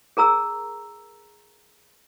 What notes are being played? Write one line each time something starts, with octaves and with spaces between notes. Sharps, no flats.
G#4 A#4 A#5 E6